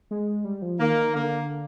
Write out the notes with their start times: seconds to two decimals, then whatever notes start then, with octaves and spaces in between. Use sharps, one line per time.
0.11 G#3
0.45 G3
0.62 F3
0.80 D#3 A#3
1.15 D3 A#3